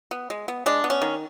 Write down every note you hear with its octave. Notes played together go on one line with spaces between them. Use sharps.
B3
G#3
B3
G#3 D4
B3
C#4
D#3